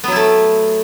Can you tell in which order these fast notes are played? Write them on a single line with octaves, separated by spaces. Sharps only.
B3 F#3 E4 A3